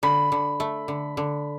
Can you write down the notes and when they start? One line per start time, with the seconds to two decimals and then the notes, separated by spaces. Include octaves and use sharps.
0.03 D3 B5
0.32 D3
0.60 A3
0.88 D3
1.17 D3